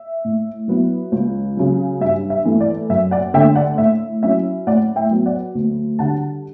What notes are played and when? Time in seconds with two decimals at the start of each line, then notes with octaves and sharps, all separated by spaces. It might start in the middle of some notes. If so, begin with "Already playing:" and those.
Already playing: E5
0.24 A2
0.68 F#3 B3 E4
1.12 C#2
1.57 C#3 F#3
2.01 G2 E5
2.30 E5
2.45 E3 A3
2.60 D5
2.89 F#2 E5
3.11 D5 F#5
3.34 D3 A3 D4 E5 G5
3.55 D5 F#5
3.78 A2 E5
4.23 F#3 C#4 E4 E5
4.67 A2 D5 F#5
4.96 E5 G5
5.11 F#3 B3
5.26 D5 F#5
5.55 D2
5.99 D3 G3 D4 F#5 A5